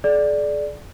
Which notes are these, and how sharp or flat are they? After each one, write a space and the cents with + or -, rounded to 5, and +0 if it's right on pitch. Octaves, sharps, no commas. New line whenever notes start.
G#4 +45 D5 +0